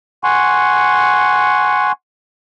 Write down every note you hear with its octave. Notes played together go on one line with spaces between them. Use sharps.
F#5 G#5 C6 C#6